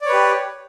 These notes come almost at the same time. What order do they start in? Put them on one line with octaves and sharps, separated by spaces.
D5 C#5 B4 G4